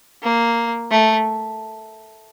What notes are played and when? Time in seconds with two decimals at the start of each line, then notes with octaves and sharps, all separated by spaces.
0.23 A#3
0.91 A3